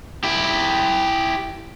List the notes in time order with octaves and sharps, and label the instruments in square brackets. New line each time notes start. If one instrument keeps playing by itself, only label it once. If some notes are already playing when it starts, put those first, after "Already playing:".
[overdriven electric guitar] E4 G4